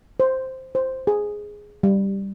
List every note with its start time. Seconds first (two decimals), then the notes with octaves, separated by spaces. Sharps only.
0.20 C5
0.75 C5
1.07 G#4
1.83 G3